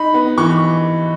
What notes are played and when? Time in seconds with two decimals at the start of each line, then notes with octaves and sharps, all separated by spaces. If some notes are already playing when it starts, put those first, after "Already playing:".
Already playing: D#4 B5
0.14 B3
0.38 E3 C#6